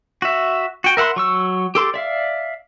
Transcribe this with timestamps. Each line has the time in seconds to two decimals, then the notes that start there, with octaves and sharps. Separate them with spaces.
0.22 F#4 E5
0.84 F#4 G5
0.97 A#4 E5 F#5 B5 C6
1.16 F#3 C#6 E6
1.75 G4 A4 C6 D6
1.94 D5 E5 F5